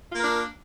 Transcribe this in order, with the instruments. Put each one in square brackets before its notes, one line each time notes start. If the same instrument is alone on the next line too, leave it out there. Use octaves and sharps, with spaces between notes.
[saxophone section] F4
A#3
A#4
D4